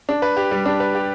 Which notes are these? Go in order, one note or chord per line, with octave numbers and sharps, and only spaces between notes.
D4
B4
G4
G3
D4
B4
G4